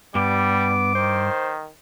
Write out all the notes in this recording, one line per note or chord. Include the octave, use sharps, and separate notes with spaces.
G2 G3 B3 D6
D#3 C5